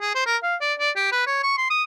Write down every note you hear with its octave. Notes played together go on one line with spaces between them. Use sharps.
G#4
C5
A#4
F5
D5
D5
G4
B4
C#5
C#6
C6
D#6